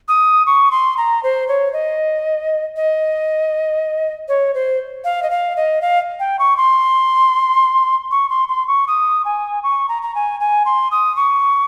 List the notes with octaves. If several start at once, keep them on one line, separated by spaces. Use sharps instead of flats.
D#6
C#6
C6
A#5
C5
C#5
D#5
D#5
C#5
C5
F5
D#5
F5
D#5
F5
G5
C#6
C6
C#6
C6
C6
C#6
D#6
G#5
C#6
A#5
A#5
G#5
G#5
C6
D#6
C#6